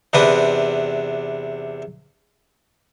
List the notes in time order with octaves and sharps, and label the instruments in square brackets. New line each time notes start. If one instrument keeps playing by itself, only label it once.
[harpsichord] E2 C3 D4 B4 D#6